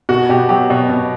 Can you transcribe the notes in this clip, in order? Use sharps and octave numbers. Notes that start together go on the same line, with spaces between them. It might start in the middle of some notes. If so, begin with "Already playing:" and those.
B2 F#4
B2 G4
F#3 G4
B2
B2